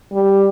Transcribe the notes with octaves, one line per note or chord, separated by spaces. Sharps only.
G3